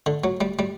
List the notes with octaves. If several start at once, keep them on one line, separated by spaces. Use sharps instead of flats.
D3
F#3
G3
G3